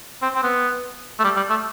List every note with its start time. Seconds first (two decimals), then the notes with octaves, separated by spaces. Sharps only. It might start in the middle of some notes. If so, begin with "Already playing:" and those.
0.22 C4
0.35 C4
0.44 B3
1.20 A3
1.24 G3
1.36 G3
1.50 A3